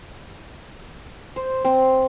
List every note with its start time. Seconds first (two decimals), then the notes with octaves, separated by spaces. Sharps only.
1.36 C5
1.65 C4